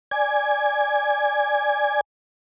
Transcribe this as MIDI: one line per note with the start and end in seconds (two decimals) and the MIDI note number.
0.11 2.01 74
0.11 2.01 80
0.11 2.01 92